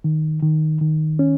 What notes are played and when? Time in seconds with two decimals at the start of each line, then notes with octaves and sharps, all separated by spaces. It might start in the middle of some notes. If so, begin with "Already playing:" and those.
0.04 D#3
0.43 D#3
0.81 D#3
1.19 C#4